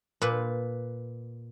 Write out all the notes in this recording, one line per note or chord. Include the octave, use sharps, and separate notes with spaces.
A#2 B4